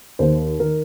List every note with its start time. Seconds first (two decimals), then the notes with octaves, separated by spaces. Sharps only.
0.19 D#2 D#3 C5
0.59 D#3 A#4